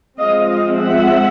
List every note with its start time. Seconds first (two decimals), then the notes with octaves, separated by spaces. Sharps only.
0.19 F3 G#3 C4 D#5 F5
0.47 D#5 F5
0.75 E5 F#5